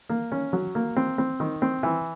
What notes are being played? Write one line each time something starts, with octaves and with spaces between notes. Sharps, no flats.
A#3
C#4
F#3
A#3
C4
C4
D#3
C4
E3